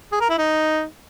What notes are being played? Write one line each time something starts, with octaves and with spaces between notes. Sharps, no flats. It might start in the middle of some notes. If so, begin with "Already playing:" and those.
G#4
A#4
E4
D#4